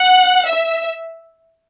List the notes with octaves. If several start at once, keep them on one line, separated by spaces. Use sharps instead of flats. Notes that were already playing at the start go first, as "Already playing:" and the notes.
Already playing: F#5
E5